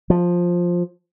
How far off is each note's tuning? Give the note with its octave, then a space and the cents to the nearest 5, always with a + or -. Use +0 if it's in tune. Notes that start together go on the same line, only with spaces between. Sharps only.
F3 +10